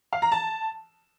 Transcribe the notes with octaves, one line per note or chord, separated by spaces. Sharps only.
F5
A#5
A5